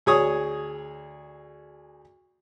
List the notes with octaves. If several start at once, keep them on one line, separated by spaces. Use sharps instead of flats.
D2 G#4 C#5 D#6